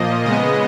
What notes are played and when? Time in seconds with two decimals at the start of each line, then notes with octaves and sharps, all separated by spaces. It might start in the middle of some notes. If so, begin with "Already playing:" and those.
Already playing: A#2 F3 A#3 D#5
0.25 C#3 G#3 B3 D#5